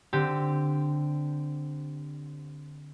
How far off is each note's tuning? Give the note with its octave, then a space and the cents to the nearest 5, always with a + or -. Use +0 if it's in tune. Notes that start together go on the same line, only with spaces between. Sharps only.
D3 +0 C4 +0 G4 +0